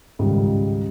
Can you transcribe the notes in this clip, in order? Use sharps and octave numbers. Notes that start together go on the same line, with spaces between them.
C#2 G#2 D#3 G3